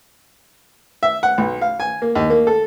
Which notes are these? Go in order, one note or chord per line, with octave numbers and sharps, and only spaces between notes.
E5
F#5
B1
F5
G#5
A#3
D#2
A#3
A4